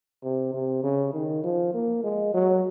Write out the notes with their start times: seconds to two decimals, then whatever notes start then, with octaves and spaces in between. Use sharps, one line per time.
0.23 C3
0.53 C3
0.83 C#3
1.14 D#3
1.44 F3
1.74 A#3
2.03 G#3
2.34 F#3